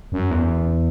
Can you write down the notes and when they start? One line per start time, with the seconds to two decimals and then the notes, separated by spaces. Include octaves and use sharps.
0.12 F#2
0.31 E2